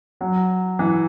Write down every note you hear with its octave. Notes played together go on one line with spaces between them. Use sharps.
F#3
E3